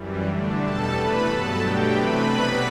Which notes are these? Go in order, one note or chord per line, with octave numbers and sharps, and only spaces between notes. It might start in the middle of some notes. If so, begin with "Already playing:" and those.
Already playing: F#2 E3 G3
D3 A3 D4
E2 B2 G3 A4 A5
C3 E3 A3 B4 B5
G2 F#3 B3 A4 A5
B2 F#3 A3 D4 G4 G5
C3 E3 A3 C4 B4 B5
B2 F#3 B3 D4